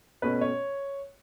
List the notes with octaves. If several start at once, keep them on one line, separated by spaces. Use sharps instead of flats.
B2 A3 C#4 B4
C#5